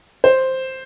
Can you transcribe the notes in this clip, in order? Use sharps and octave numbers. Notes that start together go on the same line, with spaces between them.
C5